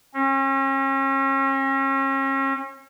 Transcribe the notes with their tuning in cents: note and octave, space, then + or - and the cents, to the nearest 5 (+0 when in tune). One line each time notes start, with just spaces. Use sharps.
C#4 -40